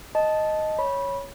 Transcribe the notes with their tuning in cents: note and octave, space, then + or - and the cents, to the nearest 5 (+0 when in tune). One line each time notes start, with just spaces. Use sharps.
D#5 +0 A5 -10
C#5 +0 B5 -15